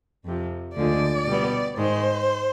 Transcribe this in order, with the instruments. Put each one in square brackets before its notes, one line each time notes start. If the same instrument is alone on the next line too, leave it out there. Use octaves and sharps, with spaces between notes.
[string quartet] F2 C3 F3
D2 D3 F3 G#3 D5
B2 G3 B3
G#2 D#3 G#3 C5